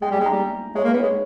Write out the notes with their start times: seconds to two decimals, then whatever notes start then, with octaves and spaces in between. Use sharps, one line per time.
0.02 G#3 G5
0.11 G3
0.14 G5
0.20 G#3
0.26 G3 A#5
0.75 G#3 C#5
0.84 A#3
0.88 B4
0.93 B3
1.00 G#3 C#5